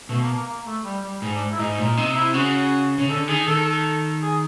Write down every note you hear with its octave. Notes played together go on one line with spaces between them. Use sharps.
B2 A3
A#3
A#3
A#3
A3
G3
G3
G#2
D4
E4
G#2 D#4
A#2
C3 D#4
E4
C#3 F#4
C#3
D3 A4
D#3 G#4
D#3 A4
A4
G#4